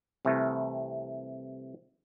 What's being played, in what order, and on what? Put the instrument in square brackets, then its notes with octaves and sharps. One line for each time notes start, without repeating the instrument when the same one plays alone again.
[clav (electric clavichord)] C2 C3 E3 A3